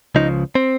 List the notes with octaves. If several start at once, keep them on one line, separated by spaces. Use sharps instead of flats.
C#2 C#3 F3 D#4
C4